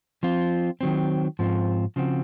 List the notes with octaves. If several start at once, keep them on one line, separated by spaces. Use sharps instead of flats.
F3 C4 F4
D#3 F#3 C4
G#2 F3 C4 F4
C#3 F3 C4 F#4